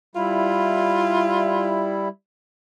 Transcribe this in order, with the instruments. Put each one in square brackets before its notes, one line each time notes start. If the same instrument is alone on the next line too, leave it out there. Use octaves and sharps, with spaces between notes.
[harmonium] G3 E4 [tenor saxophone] F4